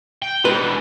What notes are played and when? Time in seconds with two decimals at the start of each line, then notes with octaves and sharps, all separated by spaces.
0.22 G5
0.45 G#2 D3 B4